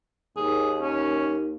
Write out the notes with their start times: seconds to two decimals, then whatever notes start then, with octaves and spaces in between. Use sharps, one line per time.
0.37 D#2 G#4
0.82 C#4